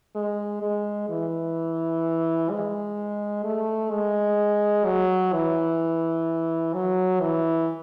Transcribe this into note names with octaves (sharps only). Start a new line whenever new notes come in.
G#3
G#3
E3
G#3
A3
G#3
F#3
E3
F#3
E3